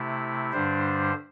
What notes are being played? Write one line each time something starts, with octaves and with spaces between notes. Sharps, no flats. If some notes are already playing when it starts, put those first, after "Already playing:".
Already playing: C3 A3 E4
G2 D3 G3 D4 C5